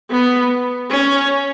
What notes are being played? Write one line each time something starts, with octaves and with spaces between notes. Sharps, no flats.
B3
C#4